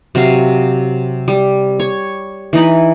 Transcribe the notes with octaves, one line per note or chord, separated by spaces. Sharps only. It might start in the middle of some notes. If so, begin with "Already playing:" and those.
C3 F#3 F5
G3
C#5
E3 D#4 B5